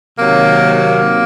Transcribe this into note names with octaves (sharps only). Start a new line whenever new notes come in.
C3 D#3 F#3 A#3
A#3